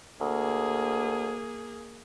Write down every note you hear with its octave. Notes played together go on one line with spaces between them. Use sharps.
D2 A#3 G#4